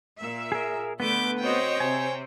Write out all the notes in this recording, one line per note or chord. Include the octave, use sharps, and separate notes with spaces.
A#2 E5
G#4 A#4
D3 A3 B3 B4 D6 G6
C4 F#4 C5 C#5 D#5 G5
C3 G#5